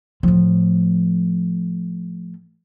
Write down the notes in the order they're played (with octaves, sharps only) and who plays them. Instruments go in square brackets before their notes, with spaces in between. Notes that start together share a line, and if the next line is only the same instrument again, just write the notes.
[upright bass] A2 F3